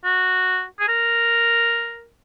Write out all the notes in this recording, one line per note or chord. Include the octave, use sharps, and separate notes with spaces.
F#4
G#4
A#4